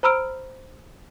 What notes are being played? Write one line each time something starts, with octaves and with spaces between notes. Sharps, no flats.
C5 A#5 B5 E6 F6 D7